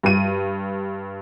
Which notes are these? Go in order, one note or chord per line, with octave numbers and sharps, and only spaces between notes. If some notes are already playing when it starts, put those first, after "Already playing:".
G2 D#7